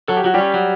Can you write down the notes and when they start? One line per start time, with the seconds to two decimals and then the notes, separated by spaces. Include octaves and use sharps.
0.08 F#3 A4
0.17 G4
0.24 F#3 F#4
0.34 G3 C#4 G4
0.54 F#3